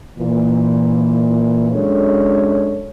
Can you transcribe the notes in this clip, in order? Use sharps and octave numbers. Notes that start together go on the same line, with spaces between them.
A#2 E3
F#2 G#3 D4 A4 C#5